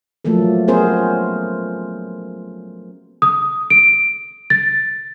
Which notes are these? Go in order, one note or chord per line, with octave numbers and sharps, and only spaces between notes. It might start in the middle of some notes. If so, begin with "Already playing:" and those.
F3 F#3 A3 A#3 A4
B3 C#4 G#4 A#4 C5
D#6
D7
A6